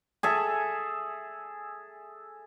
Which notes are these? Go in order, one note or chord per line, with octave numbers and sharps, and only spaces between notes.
G#4 A4 E5